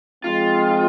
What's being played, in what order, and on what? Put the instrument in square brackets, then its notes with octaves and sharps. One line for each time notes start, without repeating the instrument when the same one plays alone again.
[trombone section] F3 G#3 C4 D#4 [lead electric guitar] F4